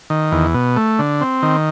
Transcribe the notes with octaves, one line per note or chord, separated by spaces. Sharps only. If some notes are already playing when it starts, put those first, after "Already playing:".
D#3
E2
B2
A3
D3
C4
D#3